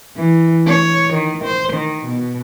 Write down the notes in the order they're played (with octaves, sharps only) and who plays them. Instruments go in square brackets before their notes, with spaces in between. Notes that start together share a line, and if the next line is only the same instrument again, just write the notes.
[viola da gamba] E3
C#5
D#3
C5
D#3
B2